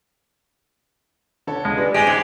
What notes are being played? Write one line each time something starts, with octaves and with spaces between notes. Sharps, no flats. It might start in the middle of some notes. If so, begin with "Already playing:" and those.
D3 A4 C#5
C#2 G#3
G3 D4 B4
G#1 G#3 G4 G#5 A#6
G#2